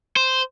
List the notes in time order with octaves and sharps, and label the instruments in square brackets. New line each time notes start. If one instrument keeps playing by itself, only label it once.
[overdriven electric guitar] C5